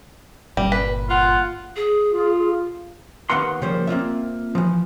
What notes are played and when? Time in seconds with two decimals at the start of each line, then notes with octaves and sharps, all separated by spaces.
0.57 G1 A#2 G3
0.72 B4
1.08 F4 F#5
1.76 G#4
2.13 F4
3.30 D#2 D#3 B3 F5 F#5 C6
3.62 C#3 F3 G3 A#3 C5
3.87 A#3 C4 F4 E5
4.55 E3 F3